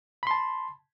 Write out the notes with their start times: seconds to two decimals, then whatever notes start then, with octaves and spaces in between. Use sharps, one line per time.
0.23 B5
0.27 C6
0.31 A5